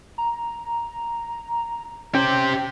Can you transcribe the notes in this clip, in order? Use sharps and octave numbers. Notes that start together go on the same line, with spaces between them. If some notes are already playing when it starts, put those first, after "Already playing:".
A#5
C#4 G4 C5 G5